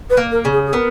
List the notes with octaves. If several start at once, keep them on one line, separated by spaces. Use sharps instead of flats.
B4
A#3
A#4
C#3
G#4
G#4
B3 A#4